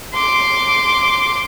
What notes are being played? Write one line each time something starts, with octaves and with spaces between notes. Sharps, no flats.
C6 D6